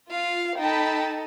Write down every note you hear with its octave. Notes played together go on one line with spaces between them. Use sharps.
F4 F5
D#4 A4 G5 A5 B5